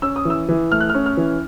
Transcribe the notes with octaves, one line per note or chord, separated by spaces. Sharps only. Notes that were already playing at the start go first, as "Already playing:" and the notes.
C#4 E6
D#6
E3 E6
E3
A3 F6
F#6
C#4 F6
F6
E3